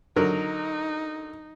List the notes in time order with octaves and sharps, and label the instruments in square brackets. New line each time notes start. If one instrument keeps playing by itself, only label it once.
[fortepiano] D3 F#3 A#4 [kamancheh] D#4